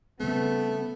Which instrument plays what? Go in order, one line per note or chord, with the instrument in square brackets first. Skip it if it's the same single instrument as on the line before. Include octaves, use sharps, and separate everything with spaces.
[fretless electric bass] C#3 G3 C4 [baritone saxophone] A3 [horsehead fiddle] B3